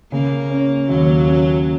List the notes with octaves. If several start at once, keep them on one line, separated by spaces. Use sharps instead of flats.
C#3 A#3
C#4
D#2 F#3
C#4